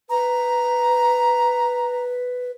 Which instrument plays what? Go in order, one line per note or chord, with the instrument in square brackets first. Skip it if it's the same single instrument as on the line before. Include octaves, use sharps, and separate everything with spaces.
[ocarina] B4 [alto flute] A#5